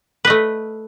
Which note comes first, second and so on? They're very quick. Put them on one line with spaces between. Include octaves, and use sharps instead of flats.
B4 D#5 A3